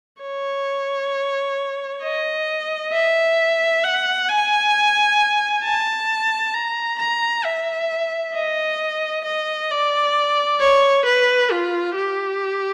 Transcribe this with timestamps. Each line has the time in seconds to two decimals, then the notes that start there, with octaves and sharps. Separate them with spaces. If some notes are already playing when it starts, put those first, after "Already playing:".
0.22 C#5
2.03 D#5
2.92 E5
3.84 F#5
4.29 G#5
5.64 A5
6.54 A#5
6.99 A#5
7.45 E5
8.34 D#5
9.25 D#5
9.71 D5
10.60 C#5
11.06 B4
11.51 F4
11.96 G4